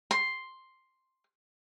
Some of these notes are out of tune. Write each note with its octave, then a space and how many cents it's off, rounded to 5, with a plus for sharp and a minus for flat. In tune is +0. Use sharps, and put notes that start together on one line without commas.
C6 +5